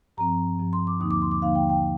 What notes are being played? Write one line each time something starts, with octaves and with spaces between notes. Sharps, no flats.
G2 F3 C4 A#5
G2 F3 C4
C6
D6
D#2 D3 F3 A#3 D#4 D#6
D6
C6
D6
D#2 D3 F3 A#3 D#4 F5
G5
G5